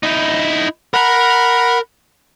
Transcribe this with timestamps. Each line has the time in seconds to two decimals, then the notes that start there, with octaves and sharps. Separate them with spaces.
0.03 D#4 E4
0.94 A#4 F#5 A#5 B5